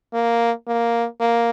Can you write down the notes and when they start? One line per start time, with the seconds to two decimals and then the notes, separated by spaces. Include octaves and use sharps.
0.14 A#3
0.68 A#3
1.21 A#3